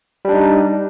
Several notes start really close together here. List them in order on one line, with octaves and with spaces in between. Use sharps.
G3 D4 D#4